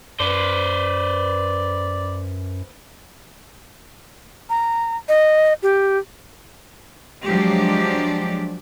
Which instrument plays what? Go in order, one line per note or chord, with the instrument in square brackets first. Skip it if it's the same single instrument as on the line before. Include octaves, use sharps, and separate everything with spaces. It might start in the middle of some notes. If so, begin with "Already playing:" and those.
[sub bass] F#2 [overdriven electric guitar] B4 C5 [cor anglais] D5
[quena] A#5
D#5
G4
[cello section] F3 F#3 G#3 D4 G4